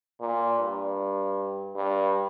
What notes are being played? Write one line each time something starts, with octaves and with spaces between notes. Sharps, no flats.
A#2
G2
G2